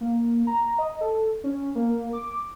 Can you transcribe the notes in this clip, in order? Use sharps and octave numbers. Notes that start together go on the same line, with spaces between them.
A#3
A#5
D#5
A4
C#4
A#3
D6